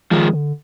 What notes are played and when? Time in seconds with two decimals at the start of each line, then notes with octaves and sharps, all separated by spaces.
0.11 D#3 F3 G#3
0.33 D3